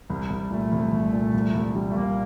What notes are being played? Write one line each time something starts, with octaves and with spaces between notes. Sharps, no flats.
C2 G3
C2 G3
A#2 A3
C2
C2
A#2
C2
C2
G3
A3
C2 A#3